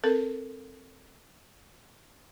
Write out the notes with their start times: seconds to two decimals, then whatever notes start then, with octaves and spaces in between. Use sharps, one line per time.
0.04 C4 A4 A#4